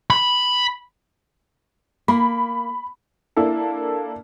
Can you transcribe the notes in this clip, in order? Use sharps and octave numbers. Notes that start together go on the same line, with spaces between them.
B5
A#3 B5
A#3 D4 E4 A4